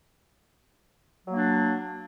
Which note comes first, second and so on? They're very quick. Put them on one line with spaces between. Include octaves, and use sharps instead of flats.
F#3 A#3 D4